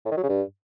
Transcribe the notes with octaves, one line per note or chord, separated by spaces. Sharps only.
A2
D#3
F#3
C#3
G2